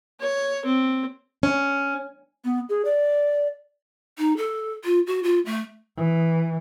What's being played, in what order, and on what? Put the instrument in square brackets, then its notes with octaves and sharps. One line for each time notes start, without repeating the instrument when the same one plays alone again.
[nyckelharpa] C#5
C4
[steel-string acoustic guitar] C#4
[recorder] B3
G#4
D5
[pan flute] D#4
A4
F4
F#4
F4
A3
[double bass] E3